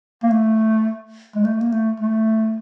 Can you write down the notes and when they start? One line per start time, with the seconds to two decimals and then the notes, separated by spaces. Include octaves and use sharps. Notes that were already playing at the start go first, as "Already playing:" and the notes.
0.23 A#3
0.30 A3
1.36 G#3
1.44 A3
1.61 A#3
1.72 A3
2.00 A3